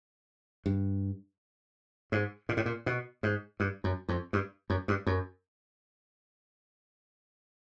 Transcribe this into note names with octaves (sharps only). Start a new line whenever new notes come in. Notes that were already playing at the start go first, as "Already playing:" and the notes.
G2
G#2
A#2
A2
A#2
B2
G#2
G2
F#2
F2
G2
F#2
G2
F#2